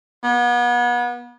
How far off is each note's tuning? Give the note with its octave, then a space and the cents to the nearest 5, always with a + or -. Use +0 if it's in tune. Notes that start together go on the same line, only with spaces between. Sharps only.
B3 -35